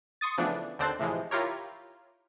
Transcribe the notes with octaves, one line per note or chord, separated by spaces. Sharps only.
C6 C#6 D#6 A6
C#3 E3 F3 A3 B3 D4
D#2 D3 C4 C5 A5 F#6
A2 C3 E3 F3 G#3
E4 F4 G4 A#4 C#5